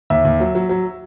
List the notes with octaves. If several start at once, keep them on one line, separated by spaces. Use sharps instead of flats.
D#2 E5
D#2
F#3
F#3
F#3